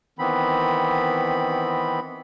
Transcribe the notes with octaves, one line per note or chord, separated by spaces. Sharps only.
D#3 E3 B3 C4 B5